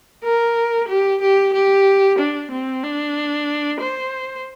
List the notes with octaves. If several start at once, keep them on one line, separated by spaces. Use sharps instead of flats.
A#4
G4
G4
G4
D4
C4
D4
C5